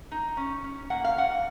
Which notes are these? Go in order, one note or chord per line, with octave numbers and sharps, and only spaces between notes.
D#4
C#4
C#4
A#3 F#5
F5
G#2 F#5